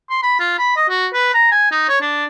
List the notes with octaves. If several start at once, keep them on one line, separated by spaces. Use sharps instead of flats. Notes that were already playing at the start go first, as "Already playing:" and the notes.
C6
B5
F4
B5
D#5
F#4
B4
A#5
G#5
D#4
C#5
D4